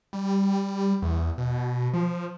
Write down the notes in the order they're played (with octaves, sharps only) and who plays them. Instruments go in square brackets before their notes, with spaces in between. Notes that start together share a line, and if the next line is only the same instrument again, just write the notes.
[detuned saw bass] G3
E2
B2
F3